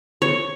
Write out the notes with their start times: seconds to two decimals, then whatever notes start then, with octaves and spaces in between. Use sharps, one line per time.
0.22 C#5